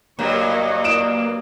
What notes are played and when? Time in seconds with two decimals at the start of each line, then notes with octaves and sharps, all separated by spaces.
0.19 G2 F#3 A#3 C#5 D#5
0.84 D#6 D7 E7